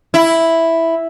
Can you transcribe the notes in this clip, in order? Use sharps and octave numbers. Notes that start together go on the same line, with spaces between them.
E4